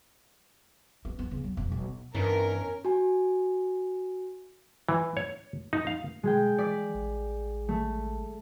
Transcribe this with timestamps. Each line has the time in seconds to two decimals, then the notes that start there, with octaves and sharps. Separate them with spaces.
1.05 B3
1.19 B3
1.31 C#3
1.44 F#3
1.57 E1
1.72 B1
2.15 G2 E3 B3 C#4 D#4 A#4
2.85 F#4 G#5
4.89 E3
5.17 C#5
5.73 D#4
5.87 F5
6.23 B2 G#3 G#4 G5
6.58 E3 D5 B6
6.94 A1
7.68 A3